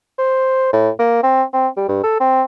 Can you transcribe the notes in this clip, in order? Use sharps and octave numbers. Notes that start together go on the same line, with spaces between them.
C5
A2
A#3
C4
C4
G3
G2
A4
C4